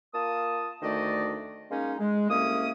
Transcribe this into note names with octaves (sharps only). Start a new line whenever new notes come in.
A#3 F4 A5 D#6
D2 D#3 A3 D4 D5 D#5
G#3 A#3 C#4 D#4
G#3
C2 A3 A#3 C#4 D#6